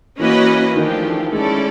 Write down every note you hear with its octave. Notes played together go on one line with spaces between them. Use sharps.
E3 A#3 C#4 F#4 B4 D#5
D#3 F3 A3 D4 G4
G#3 A3 C#4 E4 A4 D5